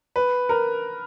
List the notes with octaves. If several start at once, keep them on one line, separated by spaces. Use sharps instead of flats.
B4
A#4